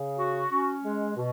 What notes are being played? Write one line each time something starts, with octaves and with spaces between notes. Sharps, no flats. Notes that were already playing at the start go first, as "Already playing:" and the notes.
Already playing: C#3
F#4
C#4
G#3
B2